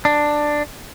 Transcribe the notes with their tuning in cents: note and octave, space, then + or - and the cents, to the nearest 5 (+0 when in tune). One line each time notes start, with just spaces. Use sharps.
D4 +10